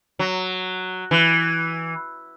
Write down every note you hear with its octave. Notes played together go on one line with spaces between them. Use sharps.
F#3
E3